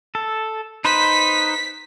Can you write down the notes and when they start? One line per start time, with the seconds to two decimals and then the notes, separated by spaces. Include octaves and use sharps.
0.15 A4
0.85 D#4 B4 C5 B6